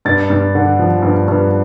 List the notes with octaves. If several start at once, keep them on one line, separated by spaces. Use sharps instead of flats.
G2 A6
G2
D3
F3
G2
G2